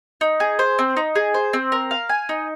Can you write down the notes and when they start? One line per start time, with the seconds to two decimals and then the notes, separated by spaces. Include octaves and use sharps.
0.21 D#4
0.40 G#4
0.59 C5
0.79 C4
0.96 D#4
1.15 G#4
1.34 C5
1.53 C4
1.72 A#4
1.91 F5
2.09 G#5
2.29 D#4